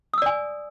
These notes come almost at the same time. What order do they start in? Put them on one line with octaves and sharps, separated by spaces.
D#6 E6 D5 G#5